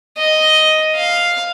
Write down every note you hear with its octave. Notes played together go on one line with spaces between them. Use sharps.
D#5
F5